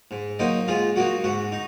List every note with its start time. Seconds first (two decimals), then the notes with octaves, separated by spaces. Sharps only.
0.11 G#2
0.39 F#3 A#3 D#4 C5 D#5
0.68 G#2 F4 G#4
0.96 F#3 A#3 D#4 F#4
1.24 G#2 F#4
1.52 D#4